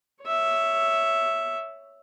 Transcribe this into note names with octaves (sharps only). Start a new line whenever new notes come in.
C#5 E5